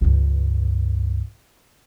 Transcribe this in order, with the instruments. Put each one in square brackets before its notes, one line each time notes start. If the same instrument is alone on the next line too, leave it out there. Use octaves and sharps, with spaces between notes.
[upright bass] C#2 G2